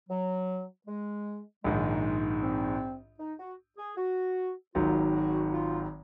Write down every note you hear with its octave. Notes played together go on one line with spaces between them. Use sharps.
F#3
G#3
A#1 G#2 D#3 G#3
C4
D#4
F#4
G#4
F#4
G#1 G#2 D#3 F#3 F4
F#4
F4